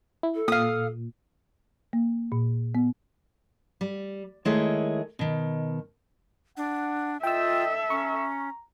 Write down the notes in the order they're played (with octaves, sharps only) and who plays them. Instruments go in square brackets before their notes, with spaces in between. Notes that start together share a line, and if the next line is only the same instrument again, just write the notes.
[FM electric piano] E4
[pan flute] A4
[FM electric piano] A#2 [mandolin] F5 D#6
[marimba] A#3
A#2
B3
[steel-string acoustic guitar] G3
D#3 G#3 A3 E4 G#4 C#5
B2 D#3
[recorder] D4 [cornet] F#5
[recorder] F4 [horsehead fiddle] A4 E5 [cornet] D#5 [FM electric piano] G5 E6
[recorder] C#4 [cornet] A#5 [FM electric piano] C#6